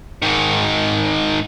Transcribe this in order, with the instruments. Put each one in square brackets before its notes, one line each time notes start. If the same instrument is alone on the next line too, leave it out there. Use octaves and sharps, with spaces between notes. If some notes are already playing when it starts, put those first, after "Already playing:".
[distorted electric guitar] G#2 D#3